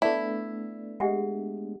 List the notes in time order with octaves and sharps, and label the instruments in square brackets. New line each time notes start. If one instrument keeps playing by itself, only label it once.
[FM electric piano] A3 B3 D4 [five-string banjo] E4
[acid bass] G#3 [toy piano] G4 E5 F#5